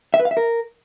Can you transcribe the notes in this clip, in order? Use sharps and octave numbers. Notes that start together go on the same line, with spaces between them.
E5
B4
F5
E5
A#4